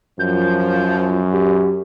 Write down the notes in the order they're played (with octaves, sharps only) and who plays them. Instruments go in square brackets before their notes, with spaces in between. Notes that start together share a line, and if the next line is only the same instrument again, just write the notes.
[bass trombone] F#2 [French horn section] F3 [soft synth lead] G6
[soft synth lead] G4